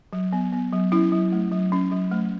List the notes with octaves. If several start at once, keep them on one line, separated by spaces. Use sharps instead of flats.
F#3
B3
B3
F#3
C#4 E4
F#3
A3
F#3
C#4
F#3
A3